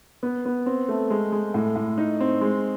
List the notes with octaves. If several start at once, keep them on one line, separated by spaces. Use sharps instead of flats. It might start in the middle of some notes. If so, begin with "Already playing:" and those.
B3
B3
C4
A3
G#3
G#3
A2
A2
D#4
C4
G#3